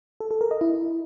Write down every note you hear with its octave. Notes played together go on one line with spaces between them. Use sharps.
A4
A4
A#4
D#5
E4